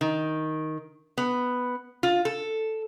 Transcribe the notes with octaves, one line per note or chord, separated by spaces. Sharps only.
D#3
B3
F4
A4